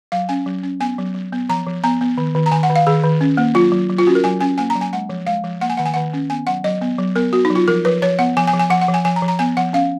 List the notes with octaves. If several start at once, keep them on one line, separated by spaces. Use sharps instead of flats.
F#3 F5
C#4 G#5
F#3
C#4
B3 G#5
F#3
F#3
B3
F3 A#5
F3
B3 A#5
B3
D#3
D#3
A#5
D#3 G#5
F#5
D#3
F5
D#3 G#4
D#3
C#4
A#3
F#3 F4
F#3
F#3
F4
C#4 F#4
A#4
F#3 G#5
C#4 G#5
A#3 G#5
A#5
F#3
G#5
G#3 F#5
F3
G#3 F5
F3
A#3 F#5
G#5
D#3 F#5
G#5
D#3 F#5
C#4
B3 G#5
F#3 F#5
F#3 D#5
B3
F#3
B3 A#4
B3 F#4
D#4
F#3
F4
F3 A#4
F3 B4
F3 C#5
B3 F#5
F3 G#5
G#5
F3
G#5
F3 F#5
F#5
F3
G#5
F3 G#5
A#5
F3
A#5
B3 G#5
F3 F#5
C#4 F5